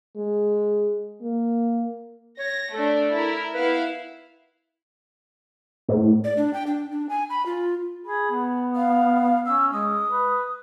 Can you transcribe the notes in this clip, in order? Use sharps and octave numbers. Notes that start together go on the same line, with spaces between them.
G#3
A#3
C#5 A#6
A3 D4 A4
E4 A#4
B3 E4 B4 F5
A2
D5
D4
G5
D4
D4
G#5
B5
F4
G#4 B5
B3
F5
C#4 E6
G#3 D#6
B4